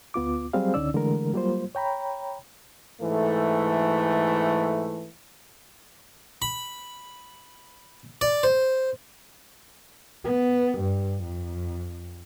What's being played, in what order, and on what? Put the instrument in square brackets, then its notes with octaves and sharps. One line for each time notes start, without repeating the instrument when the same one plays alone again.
[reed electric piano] D2 B3 F4 D6
F#3 G3 C4 G#4 C5 F5
C#2 D3 C#4 D#4 D5 E6
D3 E3 G#3 A3 A#4
F#3 G3 A#3 F4 C5
C#5 G5 A#5 B5
[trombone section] G#2 E3 A3
[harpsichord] B5
D5
C5
[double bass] B3
G2
F2